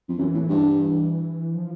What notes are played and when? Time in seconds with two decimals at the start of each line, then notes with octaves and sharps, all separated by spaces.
0.09 F2
0.19 F#2 E3
0.34 A2
0.49 G2
1.55 F3